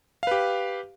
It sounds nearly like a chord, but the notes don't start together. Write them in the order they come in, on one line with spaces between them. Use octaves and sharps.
F5 B4 G4